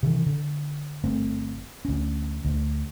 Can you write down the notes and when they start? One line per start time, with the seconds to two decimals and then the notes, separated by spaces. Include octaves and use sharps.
0.03 C3 D#3 E3
0.26 D3
1.04 G1 A3 C4
1.85 D2 C#4
2.45 D2